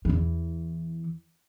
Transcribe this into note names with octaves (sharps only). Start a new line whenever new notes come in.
E2 E3